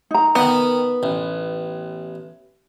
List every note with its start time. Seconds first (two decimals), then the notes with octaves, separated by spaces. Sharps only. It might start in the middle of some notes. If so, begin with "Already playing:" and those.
0.11 D#4 A#5
0.35 D#3 B3 D#5
1.03 A1